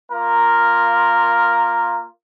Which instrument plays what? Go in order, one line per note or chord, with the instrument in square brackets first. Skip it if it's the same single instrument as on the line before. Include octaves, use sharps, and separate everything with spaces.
[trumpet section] A#3 F4 A#4